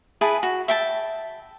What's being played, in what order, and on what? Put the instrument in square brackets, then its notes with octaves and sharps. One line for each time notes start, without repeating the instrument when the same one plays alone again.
[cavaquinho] E4 G#4 B4 A5
F#4
E5 G5 A5